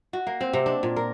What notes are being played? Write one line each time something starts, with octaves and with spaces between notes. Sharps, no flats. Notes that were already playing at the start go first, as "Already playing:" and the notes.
F#4
A#3
C4
C3
D4
A#2
A#4